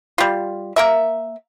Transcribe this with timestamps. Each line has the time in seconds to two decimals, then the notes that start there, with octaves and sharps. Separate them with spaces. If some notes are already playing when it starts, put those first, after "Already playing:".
0.18 G3 F4
0.76 A#3 A#4 E5